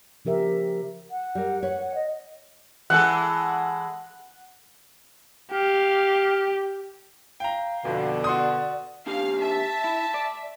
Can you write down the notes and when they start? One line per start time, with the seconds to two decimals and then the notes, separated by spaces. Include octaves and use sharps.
0.25 C#3 F3 G4 A#4 E5
1.10 F#5
1.35 G3 A#4
1.63 B4 C#5
1.94 D#5
2.90 E3 G#3 A4 F#5
5.52 G4 F5
7.40 F5 G5 A#5
7.85 F2 B2 D3
8.24 F#4 D5 C6 D#6
9.06 D#2 D4 G4 F5
9.42 A3 E5 A5
9.84 E4
10.14 D5